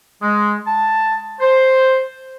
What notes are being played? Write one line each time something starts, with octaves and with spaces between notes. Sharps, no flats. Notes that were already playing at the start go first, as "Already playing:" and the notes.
G#3
A5
C5